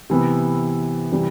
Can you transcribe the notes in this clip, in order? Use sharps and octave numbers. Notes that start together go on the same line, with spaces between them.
C3 E3 B3
C3 E3 G3